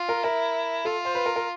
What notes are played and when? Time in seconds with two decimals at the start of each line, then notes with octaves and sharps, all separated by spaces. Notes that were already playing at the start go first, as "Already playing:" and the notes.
Already playing: F4
0.09 A#4
0.23 E4 A#4
0.85 F4 A4
1.05 C5
1.15 B4
1.26 A#4
1.36 A#4